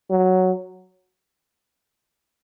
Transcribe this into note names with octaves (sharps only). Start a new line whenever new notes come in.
F#3